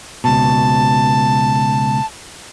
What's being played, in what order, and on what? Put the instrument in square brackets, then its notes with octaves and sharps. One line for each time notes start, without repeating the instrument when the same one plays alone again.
[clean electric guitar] C#2 B2 [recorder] A5